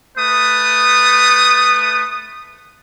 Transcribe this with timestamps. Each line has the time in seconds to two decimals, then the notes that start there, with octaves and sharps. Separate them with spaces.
0.18 A3 B4 D#6